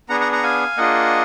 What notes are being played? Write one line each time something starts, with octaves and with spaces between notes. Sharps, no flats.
B3 D4 G#4 F#5 A#5
F#5 A#5
F#5 A#5
F5 G#5
A#3 D4 F4 G#4 D#5 F#5